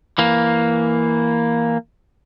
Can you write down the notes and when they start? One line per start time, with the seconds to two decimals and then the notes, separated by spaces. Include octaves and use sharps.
0.18 E3 A#3